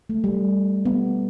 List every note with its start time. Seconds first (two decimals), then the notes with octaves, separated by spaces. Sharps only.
0.09 A3
0.24 G3
0.85 B3